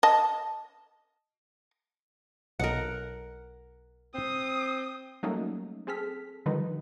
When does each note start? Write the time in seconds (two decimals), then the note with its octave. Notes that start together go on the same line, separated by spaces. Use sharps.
0.03 D#5 A5
2.60 B1 A#4 D#5 F#5
4.14 C4 D#6
5.23 F#3 G3 A3 A#3 C#4 D#4
5.87 C4 G#4 A4 F6 B6
6.46 D3 D#3 F3 G3 D#4 B4